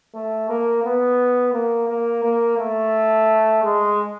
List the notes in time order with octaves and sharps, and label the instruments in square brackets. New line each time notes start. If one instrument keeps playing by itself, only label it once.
[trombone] A3
A#3
B3
A#3
A#3
A#3
A3
G#3